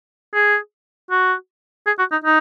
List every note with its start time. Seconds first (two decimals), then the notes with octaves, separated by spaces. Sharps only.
0.34 G#4
1.11 F#4
1.87 G#4
1.99 F#4
2.12 D#4
2.24 D#4